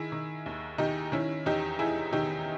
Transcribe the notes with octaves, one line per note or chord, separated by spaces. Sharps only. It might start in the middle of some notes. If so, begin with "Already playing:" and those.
Already playing: D#3 E4 G#4
D#3
D#2
D#3 D#4 G4
D#3 C#4 E4
E2 D#4 G4
E2 E4 G#4
D#3 D#4 G4